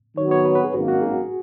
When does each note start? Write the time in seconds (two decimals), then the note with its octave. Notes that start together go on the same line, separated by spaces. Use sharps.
0.17 D#3 F#3 B3 C#5
0.31 C#5
0.45 B4
0.55 B4
0.64 G#4
0.74 G#1 F#2 D#3 A#3 F#4
0.88 F#4
1.02 G#4